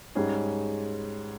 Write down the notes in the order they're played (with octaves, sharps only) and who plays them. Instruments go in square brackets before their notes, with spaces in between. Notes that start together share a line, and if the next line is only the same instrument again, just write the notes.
[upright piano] G#2 G3 C#4 G#4